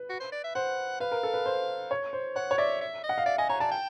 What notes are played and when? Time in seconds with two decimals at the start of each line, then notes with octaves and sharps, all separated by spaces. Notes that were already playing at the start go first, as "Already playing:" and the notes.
Already playing: B4
0.10 F#4
0.20 C5
0.32 D5
0.44 E5
0.55 C5 F#5
1.00 B4 F5
1.12 A#4
1.23 A4
1.34 B4
1.46 C5
1.91 C#5
2.13 C5
2.36 C#5 F#5
2.51 C#5
2.58 D5 E5
2.81 E5
3.04 D#5
3.09 F#5
3.18 F5
3.26 D5 E5
3.38 D#5 G#5
3.49 C#5 A#5
3.60 D5 A5
3.72 G5